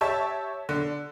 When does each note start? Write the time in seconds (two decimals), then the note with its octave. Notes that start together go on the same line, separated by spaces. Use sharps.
0.01 G4 C#5 E5 A5
0.69 D3